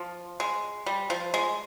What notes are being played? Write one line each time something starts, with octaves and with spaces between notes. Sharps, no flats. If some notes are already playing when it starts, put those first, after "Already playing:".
Already playing: F3
G#3
G3
F3
G#3